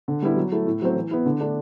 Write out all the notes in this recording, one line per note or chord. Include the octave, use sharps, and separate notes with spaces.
D3
G3 B3 E4
F#3
A3 E4
A2
F#3 A3 C4
E3
B3 E4
D3
A3 D4